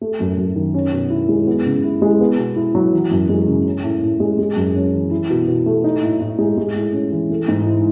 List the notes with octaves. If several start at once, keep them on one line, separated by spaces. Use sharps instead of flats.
A3
F#2
F#2
D#3
C#4
B2
E4
G#3
B3
C#3
E4
G#3
B3
B2
E4
F#3
E3
F#2
G#3
C#3
C#4
A2
A2
G#3
G#3
F#2
C#4
E3
E4
B2
B2
A3
D#4
A2
A2
G#3
G#3
A2
C#4
E3
A3
G#2
E4